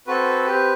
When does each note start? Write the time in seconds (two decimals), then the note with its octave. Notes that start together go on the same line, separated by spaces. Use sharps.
0.07 C4 F#4 A4 B4
0.47 C4 G4